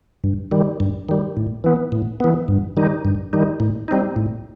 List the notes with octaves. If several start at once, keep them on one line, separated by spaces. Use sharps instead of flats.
G2
D#3 G3
G2
D#3 G3
A2
E3 B3
A2
E3 B3
G2
D#3 G3 D#4
G2
D#3 G3 D#4
A2
G3 C4 D#4
A2